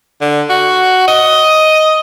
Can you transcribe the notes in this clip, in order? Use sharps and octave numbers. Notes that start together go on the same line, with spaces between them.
D3
F#4
D#5